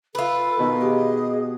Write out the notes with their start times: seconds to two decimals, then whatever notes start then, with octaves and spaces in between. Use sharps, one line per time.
0.15 F4 A4 B4
0.59 B2 D#3 D#5
0.81 G4 G#4